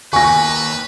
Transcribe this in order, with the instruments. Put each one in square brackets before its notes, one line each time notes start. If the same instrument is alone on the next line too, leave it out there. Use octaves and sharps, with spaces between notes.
[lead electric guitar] D#2 [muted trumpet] B4 [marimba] G#5 [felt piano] C#6 A#6